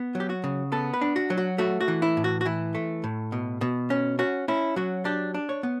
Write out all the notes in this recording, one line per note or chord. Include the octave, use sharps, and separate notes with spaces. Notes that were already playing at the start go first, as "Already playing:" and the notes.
Already playing: B3
F#3
G4
F#4
C#3
B3 A4
B4
D4
F#4
F#3
F#4
A3 F#4
F#4
E3
E4
A2
F#4
F#4
E3 E4
A3
A2
B2
B2
C#4
C#4 F#4
C#4 E4
F#3 F#4
D4 G4
D4
C#5
B3